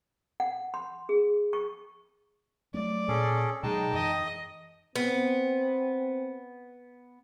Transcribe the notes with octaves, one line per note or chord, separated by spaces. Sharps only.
F#5
C6
G#4
C#6
F#3 G#3 A3 D5
A#2 C#4 G#4 A4
B2 F#3 G#3 D#4 G5 A5
F#2 E3 D#5
B3 C4